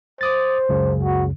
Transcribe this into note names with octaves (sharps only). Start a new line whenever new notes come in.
C5 D6 D#6 A6
C#2 F#2 C#3
F#4